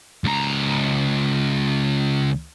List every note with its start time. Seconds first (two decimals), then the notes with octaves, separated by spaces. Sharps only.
0.24 C#2 A#5